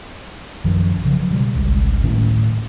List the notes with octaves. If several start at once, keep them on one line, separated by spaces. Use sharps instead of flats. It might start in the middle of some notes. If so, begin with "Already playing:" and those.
A#1 F#2 D#3 F3
C#3 F3 F#3
B2 G3
G#1 C#2
D1 A2 D#3 C#4